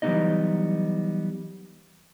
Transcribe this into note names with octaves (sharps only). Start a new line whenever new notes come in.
E3 F#3 G3 B3 D#4 D#5